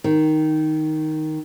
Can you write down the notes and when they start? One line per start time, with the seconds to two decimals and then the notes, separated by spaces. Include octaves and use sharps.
0.04 D#3